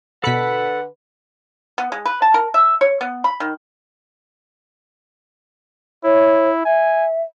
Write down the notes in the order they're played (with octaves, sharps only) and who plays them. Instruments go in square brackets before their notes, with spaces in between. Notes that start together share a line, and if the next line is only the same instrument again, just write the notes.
[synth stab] B2 B6 C#7 [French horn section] D3 B4 [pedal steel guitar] A4 B5 [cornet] F#5
[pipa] B3
G#3
B4
A5
A#4
E5
C#5
B3
B5
D#3
[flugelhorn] E4 [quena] C#5
[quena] E5 [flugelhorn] G#5